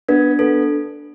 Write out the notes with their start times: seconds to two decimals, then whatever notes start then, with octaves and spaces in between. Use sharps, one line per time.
0.09 B3 D4
0.39 B3 A4